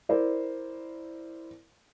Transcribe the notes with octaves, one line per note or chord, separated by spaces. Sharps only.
E4 A#4 C5 D5